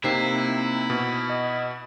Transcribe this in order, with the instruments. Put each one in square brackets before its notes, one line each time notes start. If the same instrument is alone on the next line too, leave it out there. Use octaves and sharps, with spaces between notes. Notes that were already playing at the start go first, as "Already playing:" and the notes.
[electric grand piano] C3 C7 [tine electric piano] A#3 C4 D#4 [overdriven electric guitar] E4
[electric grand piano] B2
[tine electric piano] D#5